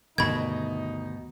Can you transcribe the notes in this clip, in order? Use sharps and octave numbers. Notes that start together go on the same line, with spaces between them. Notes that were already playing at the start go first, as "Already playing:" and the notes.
D2 G2 B2 D#3 D#4 B5 G#6